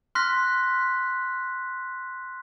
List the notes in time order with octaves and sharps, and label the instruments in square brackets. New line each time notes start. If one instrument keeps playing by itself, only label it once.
[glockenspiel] C6 F6 F#6 A#6 B6